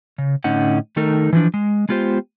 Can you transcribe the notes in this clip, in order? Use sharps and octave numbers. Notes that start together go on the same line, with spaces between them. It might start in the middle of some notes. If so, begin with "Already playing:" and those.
C#3
A2 D3 C#4 D#4 F#5
D#3 A3 D#4 A4 A#4
E3 F3 D4
G#3
G#3 B3 F4 G4 C5